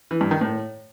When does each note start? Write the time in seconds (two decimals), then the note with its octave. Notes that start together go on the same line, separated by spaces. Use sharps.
0.11 E3
0.21 G2
0.31 D#3
0.41 A2